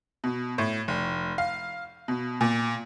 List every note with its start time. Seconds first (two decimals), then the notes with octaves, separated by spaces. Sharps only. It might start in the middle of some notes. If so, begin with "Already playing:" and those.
0.24 B2
0.58 A2
0.88 F1
1.38 F5
2.08 B2
2.41 A#2